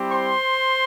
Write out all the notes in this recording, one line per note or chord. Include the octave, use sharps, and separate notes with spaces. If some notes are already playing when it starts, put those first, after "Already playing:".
Already playing: G3 C4 E4 G4
C5 C6